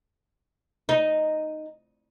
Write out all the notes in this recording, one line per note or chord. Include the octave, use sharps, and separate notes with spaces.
D#4